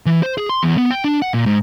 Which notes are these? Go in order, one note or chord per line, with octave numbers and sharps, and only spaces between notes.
E3
C5
G#4
C6
E2
B3
G5
D4
F#5
A#2
G#2